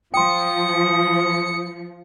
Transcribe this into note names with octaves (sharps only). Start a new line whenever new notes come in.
F3 G5 C6 D#6 C#7